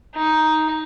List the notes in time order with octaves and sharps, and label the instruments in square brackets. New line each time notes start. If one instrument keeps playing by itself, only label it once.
[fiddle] D#4